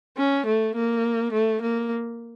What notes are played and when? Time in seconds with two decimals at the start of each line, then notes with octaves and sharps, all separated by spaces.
0.17 C#4
0.46 A3
0.75 A#3
1.32 A3
1.61 A#3